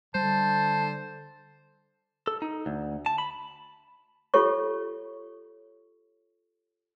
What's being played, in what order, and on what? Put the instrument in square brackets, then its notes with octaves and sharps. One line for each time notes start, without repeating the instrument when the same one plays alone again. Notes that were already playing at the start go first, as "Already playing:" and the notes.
[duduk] D3 [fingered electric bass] G3 [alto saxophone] C5 [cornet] A5
[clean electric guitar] A4
D#4
D2
A5
B5
[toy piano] F4 G4 A4 C#5 C#6